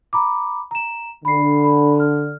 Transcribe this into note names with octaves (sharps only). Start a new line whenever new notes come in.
A#5 B5 D6
A#5 E7
D3 B5 C7
B5
F6